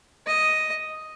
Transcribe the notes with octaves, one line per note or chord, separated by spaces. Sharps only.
D#5